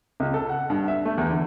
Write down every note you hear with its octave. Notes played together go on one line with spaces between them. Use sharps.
C#2
A4
F#5
G2
E5
A3
E2
D3